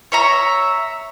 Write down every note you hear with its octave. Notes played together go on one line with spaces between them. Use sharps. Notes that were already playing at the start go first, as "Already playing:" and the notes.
C#5 E5 A#5